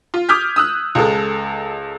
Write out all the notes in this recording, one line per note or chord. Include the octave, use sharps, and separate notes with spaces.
F4
D6 D#6 F6 G6 G#6 B6
D#6 E6 F#6
C#2 G#3 A4